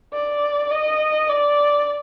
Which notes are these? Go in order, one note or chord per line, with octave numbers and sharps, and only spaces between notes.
D5
D#5
D5